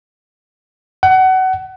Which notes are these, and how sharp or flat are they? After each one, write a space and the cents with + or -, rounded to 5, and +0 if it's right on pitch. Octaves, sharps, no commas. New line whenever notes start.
F#5 +25